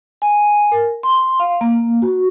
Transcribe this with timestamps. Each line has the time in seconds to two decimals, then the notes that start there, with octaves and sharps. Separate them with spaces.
0.22 G#5
0.72 A#4
1.03 C6
1.40 F5
1.61 A#3
2.02 F#4